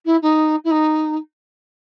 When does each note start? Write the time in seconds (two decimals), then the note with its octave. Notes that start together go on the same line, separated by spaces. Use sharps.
0.05 E4
0.22 D#4
0.64 E4
0.71 D#4